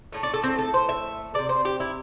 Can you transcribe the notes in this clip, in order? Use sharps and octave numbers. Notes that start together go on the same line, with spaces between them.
A2 A3
D5
A4
C4
A4
C5
E5
C3 G3 D5
C5
G4
E4